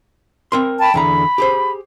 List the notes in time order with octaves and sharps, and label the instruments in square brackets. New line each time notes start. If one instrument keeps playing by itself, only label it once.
[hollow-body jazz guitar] C4 A#4 C6
[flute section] G5 A5 B5
[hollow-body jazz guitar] E2 D3 A#5 [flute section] B5
[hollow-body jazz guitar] G4 G#4 C5